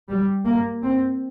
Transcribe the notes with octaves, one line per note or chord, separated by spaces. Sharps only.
G3
A#3
C4